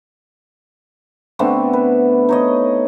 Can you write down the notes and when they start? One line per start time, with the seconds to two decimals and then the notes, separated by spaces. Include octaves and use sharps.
1.39 D3 A3 B3 C4
1.73 B4
2.29 D#4 C#5 D#5